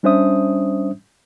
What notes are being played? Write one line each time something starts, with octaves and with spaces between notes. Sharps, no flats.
G3 C#4 D4 C5 E5 D#6